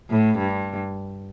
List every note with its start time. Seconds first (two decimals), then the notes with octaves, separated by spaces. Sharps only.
0.10 A2
0.38 G2